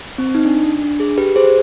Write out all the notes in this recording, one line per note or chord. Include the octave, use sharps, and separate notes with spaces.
C4
D#4
D4
D4
D4
G#4
G4 B4
G#4 C5